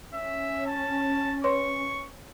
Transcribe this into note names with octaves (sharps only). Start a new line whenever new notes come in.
C#4 E5
A5
B4 C#5 C6 C#6